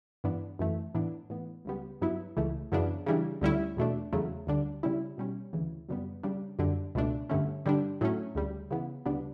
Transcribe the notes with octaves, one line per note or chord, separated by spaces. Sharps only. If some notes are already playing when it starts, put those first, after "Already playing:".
G2 E3 B3 D4
F#2 E3 A3
A2 E3 B3 D4
A2 E3 B3
C#2 C#3 G3 B3
G2 F#3 B3 E4
C#2 C#3 E3 A3
F#2 C#3 E3 B3 D4
C#3 E3 G3 D4
D2 D3 G3 C#4 E4
E2 B2 A3 D4
E2 C#3 F#3 A3
D2 D3 G3 D4
C#3 G3 C#4 E4
B2 G3 C#4
D2 C#3 E3
F#2 C#3 G3 B3
C#3 G3 D4
F#2 D3 G3 D4
C#2 B2 A3 D4
G2 D3 A3 C#4
G2 D3 G3 D4
A2 F#3 A3 C#4
D2 C#3 G3
C#3 E3 B3
D2 C#3 G3 B3 D4